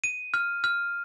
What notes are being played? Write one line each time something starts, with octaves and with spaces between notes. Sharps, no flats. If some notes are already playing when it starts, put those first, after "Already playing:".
D#7
F6
F6